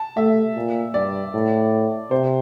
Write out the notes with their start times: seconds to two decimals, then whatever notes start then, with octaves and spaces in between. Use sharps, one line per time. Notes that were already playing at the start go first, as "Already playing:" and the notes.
Already playing: A5
0.16 A3 E5
0.55 A#2
0.94 G2 D5
1.34 A2
2.11 C3 C5